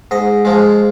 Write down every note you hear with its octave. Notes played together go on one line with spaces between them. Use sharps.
G#2 D#5
F3 G#3